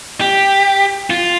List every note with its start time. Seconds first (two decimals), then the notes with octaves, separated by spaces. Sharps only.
0.21 G4
1.10 F4